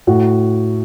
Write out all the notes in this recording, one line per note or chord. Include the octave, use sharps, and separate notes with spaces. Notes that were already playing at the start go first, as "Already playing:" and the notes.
A2 F#4